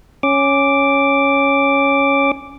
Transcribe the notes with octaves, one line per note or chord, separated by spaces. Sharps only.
C#4 D6